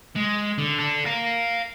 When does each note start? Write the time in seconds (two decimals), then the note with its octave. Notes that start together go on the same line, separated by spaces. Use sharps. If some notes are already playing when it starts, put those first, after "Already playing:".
0.16 G#3
0.58 D3
0.79 D4 A4
1.06 F5 A#5